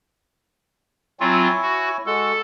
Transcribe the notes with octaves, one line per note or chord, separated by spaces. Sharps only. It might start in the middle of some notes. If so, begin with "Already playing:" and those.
F#3 C4 E4 F4 C#5 G#5
F#4
G#3 F#4 A4